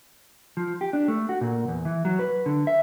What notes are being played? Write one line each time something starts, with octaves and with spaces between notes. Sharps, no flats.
F3
G4
D4
A3
F#4
A#2
E2
E3
F#3
B4
D3
E5